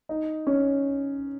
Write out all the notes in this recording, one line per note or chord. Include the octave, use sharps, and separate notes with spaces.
D#4
C#4